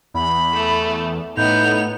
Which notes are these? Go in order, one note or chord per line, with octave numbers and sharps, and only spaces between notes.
E2 B5
A3
A2 B3 D#4 G6 F7